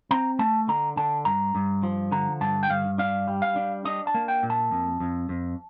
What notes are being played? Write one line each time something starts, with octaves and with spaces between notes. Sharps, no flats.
C4 A#5
A3 A5
D3 A#5
D3 A5
G2 A#5
G2
F3
D3 A#5
G2 A5
G5
G2 F5
D4 F5
G3
F5
D4
D4 D#5
A5
A#3
G5
A#2
A5
F2
F2
F2